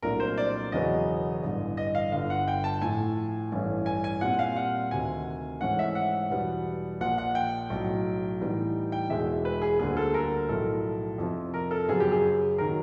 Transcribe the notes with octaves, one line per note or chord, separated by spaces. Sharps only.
C2 A#2 F#3 A3 D4 A#4
C5
D5
E1 E2 C#3 F#3 B3 D#5
A1 G2 D3
D#5
F5
G1 G2 D3 F5
F#5
G5
A5
A2 F3 A3 G#5
A1 G2 E3 A3 C#4
G#5
G#5
A#2 G3 C4 F#5
F5
F#5
D2 C3 D#3 G#5
G#2 E3 A3 C#4 F#5
E5
F#5
E2 B2 G3 B3
A#1 A#2 F3 F#5
F#5
G5
B1 A2 F#3
A2 E3 G3 B3 D#4
G5
E1 E2 B2 G#3 E5
B4
G#4
D2 D3 G3 A#3 G#4
A4
A#4
B1 A2 F3 A3 A4
F2 C3 F3
A#4
A4
F#2 C#3 F#3 B3 G#4
G4
G#4
D#3 F#3 A#4